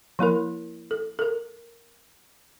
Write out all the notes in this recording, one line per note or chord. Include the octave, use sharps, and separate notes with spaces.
F3 A#3 E4 A#4
A4
A4 A#4